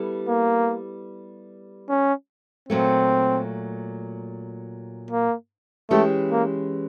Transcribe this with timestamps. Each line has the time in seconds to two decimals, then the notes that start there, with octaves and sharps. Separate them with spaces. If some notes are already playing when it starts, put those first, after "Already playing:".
Already playing: G3 B3 E4 A4
0.29 A#3
1.89 C#4
2.69 A#2 F#3 A3 C4
5.11 A#3
5.91 E3 G#3 A3 C#4 E4 G4
6.31 A#3